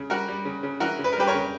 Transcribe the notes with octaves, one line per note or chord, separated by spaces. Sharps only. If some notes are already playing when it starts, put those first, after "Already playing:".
Already playing: C#3
G3 F#4 A#4
G3
C#3
C#3
E3 F#4 A#4
C#3
B4
A#4
G3 G4 B4
A#4 C#5
C#3